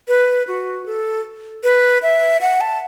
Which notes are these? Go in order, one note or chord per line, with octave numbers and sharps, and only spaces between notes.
B4
F#4
A4
B4
E5
F#5
A5